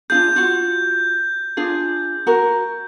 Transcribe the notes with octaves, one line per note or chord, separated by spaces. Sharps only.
D4 F4 G#4 G6
F4 F#4
D4 F4 G#4
F#4 A#4